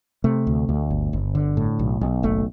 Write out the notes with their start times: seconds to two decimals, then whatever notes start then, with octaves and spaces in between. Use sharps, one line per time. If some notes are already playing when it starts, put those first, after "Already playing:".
0.24 C3 A3
0.47 D2
0.69 D2
0.90 G1
1.13 G1
1.35 D3
1.57 A2
1.79 B1
2.01 B1
2.23 F#1 A3